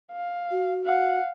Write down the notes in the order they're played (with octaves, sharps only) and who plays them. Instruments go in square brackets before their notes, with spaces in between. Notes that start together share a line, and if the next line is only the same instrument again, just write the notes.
[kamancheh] F5
[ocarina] F#4
[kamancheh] F5 F#5